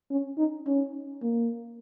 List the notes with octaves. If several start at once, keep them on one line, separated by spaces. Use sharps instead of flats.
C#4
D#4
C#4
A#3